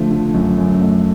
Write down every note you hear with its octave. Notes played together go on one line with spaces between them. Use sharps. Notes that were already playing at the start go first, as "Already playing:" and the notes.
Already playing: D3 F3 A3
D3
F#2
F#2
A3